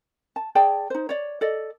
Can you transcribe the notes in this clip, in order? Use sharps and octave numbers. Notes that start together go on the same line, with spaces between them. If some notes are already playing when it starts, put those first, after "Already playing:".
A5
G#4 D5 G5 A5
D#4 C5
C#5 D5
A4 D5 D#5